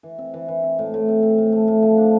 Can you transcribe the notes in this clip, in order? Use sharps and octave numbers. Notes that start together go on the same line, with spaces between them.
E3
C4
E3
E3
C4
A2
A2
C4
C4
A2
A3
A2
F3
D4